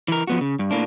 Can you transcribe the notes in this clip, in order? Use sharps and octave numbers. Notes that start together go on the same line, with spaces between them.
E3 A#4
F3 B3 F#4
C#3
G2
A2 A#3 D4